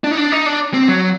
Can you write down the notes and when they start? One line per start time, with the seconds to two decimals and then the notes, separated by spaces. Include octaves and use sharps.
0.04 D4
0.11 D#4
0.17 D4
0.32 D#4
0.46 D4
0.74 C4
0.88 F#3